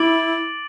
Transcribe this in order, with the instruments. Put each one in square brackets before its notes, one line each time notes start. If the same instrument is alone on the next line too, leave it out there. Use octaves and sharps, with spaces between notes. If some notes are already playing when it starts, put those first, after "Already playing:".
Already playing: [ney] E4 [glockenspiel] D6 A6 D7 F#7